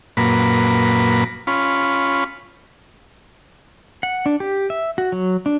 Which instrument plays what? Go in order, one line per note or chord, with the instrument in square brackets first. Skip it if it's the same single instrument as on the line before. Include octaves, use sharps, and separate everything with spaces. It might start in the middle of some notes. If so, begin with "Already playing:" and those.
[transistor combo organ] F#2 A#2 A#3 B4 B5
C#4 F4 B5
[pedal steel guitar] F#5
D4
G4
E5
F#4
F#3
D4